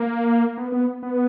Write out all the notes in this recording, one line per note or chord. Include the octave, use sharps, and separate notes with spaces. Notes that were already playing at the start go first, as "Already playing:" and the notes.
Already playing: A#3
B3
B3
B3